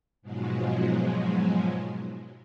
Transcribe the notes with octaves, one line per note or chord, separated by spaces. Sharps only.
G#2 B2 F3 F#3 G#3